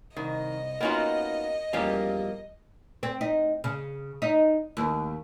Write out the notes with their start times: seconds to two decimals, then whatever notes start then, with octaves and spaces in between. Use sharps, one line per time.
0.17 C2 D#3 D#5
0.81 A#3 B3 C#4 D#4 F4 F#4
1.73 E2 G2 A#2 F3 A#3 C#4 G4 F5
3.03 C4
3.21 D#4
3.64 C#3
4.22 D#4
4.77 D#2